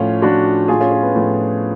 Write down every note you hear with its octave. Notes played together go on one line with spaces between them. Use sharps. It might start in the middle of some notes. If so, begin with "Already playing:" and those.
Already playing: A2 F3 C#4 F4
A2 F3 D4 F#4
A2 F3 F4 G#4
C#4 F4
C#4
B3
A2 F3